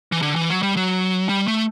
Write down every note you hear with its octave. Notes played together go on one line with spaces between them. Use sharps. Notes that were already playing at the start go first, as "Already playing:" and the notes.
E3
D3
E3
F#3
G3
F#3
G3
A3